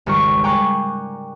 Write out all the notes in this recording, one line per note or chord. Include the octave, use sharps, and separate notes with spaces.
G#1 C#2 G3 G4 A#4 C#6
G5 G#5 A#5 C#6 D6 F#6